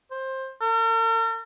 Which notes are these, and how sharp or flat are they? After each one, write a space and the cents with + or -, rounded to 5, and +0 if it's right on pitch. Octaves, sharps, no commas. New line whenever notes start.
C5 +15
A#4 -45